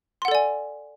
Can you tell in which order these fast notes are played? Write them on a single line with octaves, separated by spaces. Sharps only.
C6 F#5 A4 D5 G#5